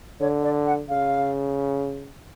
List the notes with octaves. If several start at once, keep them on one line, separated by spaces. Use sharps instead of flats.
D3 C#5
D5
F#5
C#3 F5